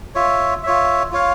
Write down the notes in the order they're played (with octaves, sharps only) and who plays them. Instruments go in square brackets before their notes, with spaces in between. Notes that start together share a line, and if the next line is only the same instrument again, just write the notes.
[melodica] F4 C#5 E5
F4 C#5 E5
F4 C#5 F5